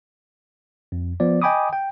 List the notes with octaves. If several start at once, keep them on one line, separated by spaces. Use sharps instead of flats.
F2
F3 B3 D5
D#5 G5 G#5 B5 D6 D#6
G5